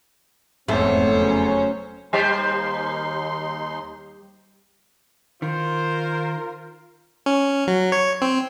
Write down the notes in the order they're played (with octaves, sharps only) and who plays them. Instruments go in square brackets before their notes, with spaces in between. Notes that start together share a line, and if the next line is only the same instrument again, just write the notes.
[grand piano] F1 E2 [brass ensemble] G#2 C4 [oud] A3 [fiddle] C5 C#5
[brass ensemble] C#3 F#3 C#4
[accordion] D#2 D#4 C6 [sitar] G3 G4 C5
[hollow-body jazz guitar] D#3 [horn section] F4 A#4 [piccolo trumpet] C5
[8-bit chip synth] C#4
F#3
C#5
C4